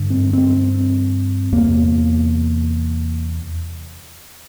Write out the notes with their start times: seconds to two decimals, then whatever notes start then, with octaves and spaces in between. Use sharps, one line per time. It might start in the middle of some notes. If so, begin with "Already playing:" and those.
Already playing: G2 D3
0.10 C4
0.33 C4
1.52 E2 C3 A#3